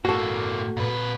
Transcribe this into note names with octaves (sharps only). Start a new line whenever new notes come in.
A2 A#3 F#4 A4
A#2 B4